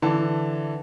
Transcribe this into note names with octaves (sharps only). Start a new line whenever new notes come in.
D3 E3 A5